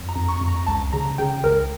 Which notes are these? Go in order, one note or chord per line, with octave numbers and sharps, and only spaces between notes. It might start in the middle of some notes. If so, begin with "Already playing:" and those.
Already playing: F2
A#5
F2
C#6
F2
A#5
C#2 A5
C#3 A#5
C#3 G5
C#2 A#4